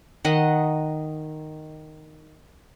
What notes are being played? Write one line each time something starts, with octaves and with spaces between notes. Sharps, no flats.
D#3 D#5 F#5